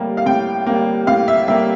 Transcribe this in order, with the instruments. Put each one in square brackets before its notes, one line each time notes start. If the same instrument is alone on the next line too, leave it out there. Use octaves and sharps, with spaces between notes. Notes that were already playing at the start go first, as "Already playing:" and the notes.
Already playing: [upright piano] A2 G3 A#3
F5
A2 G5
G3 A#3
A2 F5
E5
G3 A#3 E5